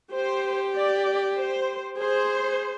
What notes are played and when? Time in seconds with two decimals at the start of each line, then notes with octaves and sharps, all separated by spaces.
0.13 G4 C5
0.75 D5
1.37 C5
1.98 G#4 C5